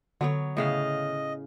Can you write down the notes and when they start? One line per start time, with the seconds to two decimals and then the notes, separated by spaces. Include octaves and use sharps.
0.21 D3 F#3 B3 C#5
0.57 A2 C#3 D#5 F5